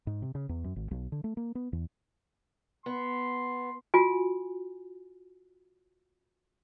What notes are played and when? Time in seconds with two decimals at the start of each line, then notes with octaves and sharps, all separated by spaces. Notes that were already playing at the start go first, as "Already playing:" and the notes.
0.07 G#2
0.22 C3
0.35 C#3
0.49 E2
0.64 F#2
0.76 G#1
0.91 B1
1.12 D3
1.24 A3
1.37 A#3
1.55 B3
1.73 E2
2.86 B3 C6
3.94 F4 F#4 G#5